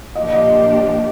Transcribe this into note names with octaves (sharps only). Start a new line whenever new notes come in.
A#2 F3 A#3 D4 G4 D#5
D#5